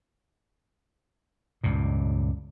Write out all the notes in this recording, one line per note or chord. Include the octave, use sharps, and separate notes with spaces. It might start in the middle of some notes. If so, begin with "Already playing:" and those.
C#2 G2 A#2